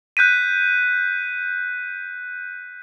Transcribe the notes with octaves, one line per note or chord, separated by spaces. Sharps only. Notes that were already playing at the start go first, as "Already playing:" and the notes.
F#6 G6 B6 D#7